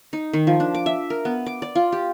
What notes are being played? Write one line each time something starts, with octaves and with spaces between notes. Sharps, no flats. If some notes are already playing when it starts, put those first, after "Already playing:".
D#4
D#3
F3
D4
D6
E5
A#4
B3
D6
D5
F4
G4